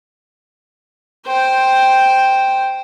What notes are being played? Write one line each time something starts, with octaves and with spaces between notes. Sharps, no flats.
C5 G5